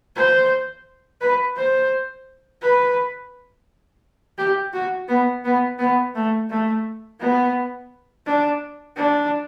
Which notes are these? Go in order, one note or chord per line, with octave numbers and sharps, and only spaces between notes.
C5
B4
C5
B4
G4
F#4
B3
B3
B3
A3
A3
B3
D4
D4